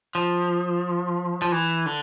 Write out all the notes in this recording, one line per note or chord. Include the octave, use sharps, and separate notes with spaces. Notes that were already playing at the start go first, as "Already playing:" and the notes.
F3
F3
E3
D3